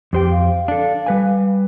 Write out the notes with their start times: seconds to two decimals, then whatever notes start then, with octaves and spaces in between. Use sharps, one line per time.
0.13 F2 G4 C5 G5
0.31 F5
0.68 D4 A4
1.06 G3 B4 G#5